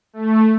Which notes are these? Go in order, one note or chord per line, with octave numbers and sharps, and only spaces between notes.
A3